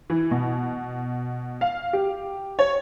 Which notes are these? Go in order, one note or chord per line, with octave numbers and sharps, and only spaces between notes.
E3
B2
F5
G4
C#5